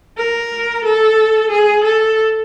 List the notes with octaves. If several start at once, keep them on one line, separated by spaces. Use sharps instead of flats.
A#4
A4
G#4
A4